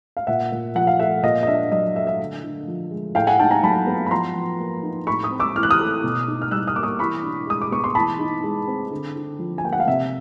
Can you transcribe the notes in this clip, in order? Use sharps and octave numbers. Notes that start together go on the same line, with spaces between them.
F5
A#2 E5 F#5
A#2
F3 F#5
F5
A3 E5 F#5
A#2 D#5 F5
D#5
D4 E5
F#3 D#5
A3 E5
E5
D3
D3
F3
G#3
A2 F5 G5
F#5 G#5
D#4 G5 A5
G#5 A#5
F#3 A5 B5
B3
B5
F3 A#5 C6
F3
A#3
D#4
A2 B5 C#6
C#6 D#6
C4
D6 E6
E3 F6
F#6
D#6 F6
A3
B2
D#4
F6
G3 E6 F#6
D#6 F6
A#3 D6
C#6 D#6
E3 B5 C#6
D4
G#3 D#6
D6
B3 C#6
C6
E3 A5 B5
D#4
G#3
C4
D3
D3
F3
G#5
A#3 G5
F#5
F5
C3 E5